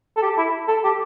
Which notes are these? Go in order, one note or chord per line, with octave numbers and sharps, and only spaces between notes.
A4
G4
E4
A4
G4